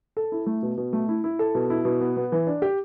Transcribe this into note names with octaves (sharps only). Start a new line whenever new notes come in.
A4
E4
A3
B2
B2
A3
E4
E4
A4
B2
E4
B2
B3
B3
E3
D4
G4